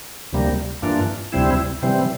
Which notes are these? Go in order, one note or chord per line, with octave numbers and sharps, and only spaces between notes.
D2 C3 G3 A#3
G2 E3 A#3 D4 F4
D2 C3 G3 C4 E4
C3 E3 G3 C4